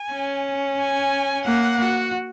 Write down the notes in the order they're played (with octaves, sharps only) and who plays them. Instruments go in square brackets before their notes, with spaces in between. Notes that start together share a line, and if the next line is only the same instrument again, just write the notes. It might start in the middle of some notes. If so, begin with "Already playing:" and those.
Already playing: [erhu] G#5
[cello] C#4
[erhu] G#5
[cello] A#3 [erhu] F#5
[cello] F#4